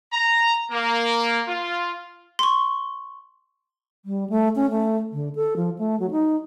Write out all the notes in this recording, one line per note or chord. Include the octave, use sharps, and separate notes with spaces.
A#5
A#3
F4
C6 C#6
G3
A3
C#4
A3
D3
A4
F3
A3
F#3
D#4